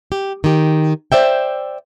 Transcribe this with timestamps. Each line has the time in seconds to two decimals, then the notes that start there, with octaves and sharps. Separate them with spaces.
0.12 G4
0.44 D#3 G4
1.12 C5 D5 E5 G5